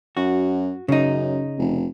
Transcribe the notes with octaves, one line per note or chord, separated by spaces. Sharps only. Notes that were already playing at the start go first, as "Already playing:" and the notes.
F#2 F#4
F#2 C#3 D#4
F1